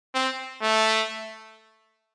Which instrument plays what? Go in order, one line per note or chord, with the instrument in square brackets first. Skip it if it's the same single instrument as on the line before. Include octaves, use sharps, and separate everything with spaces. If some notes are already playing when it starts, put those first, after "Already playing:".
[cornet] C4
A3